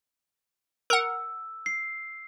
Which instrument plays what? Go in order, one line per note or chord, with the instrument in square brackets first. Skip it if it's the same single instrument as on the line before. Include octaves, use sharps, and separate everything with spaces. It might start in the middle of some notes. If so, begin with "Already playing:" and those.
[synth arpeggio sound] A#4 F#5 [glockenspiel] E6
[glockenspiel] C7